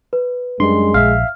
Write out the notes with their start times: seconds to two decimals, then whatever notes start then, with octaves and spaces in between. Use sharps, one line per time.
0.13 B4
0.60 F#2 G3 G#3 D4 C6
0.94 A#1 E5 F5 F6